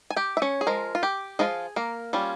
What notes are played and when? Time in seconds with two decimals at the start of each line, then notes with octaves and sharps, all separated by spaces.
0.10 G#5
0.16 G4 G5
0.37 E5
0.42 C#4 C#5
0.61 G#4
0.67 F3 G#3 A#4
0.95 F4
1.03 G4
1.39 F3 G#3 F4 G#4
1.76 A#3 A#4
2.13 G3 C#4 F4